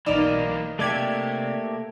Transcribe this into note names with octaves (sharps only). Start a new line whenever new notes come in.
B1 E3 A#3 D#4 D5
C3 A3 A#3 G4 D5 G#6